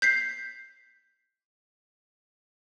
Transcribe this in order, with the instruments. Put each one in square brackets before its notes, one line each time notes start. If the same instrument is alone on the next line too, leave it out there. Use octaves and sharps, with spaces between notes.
[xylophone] G6 B6 C7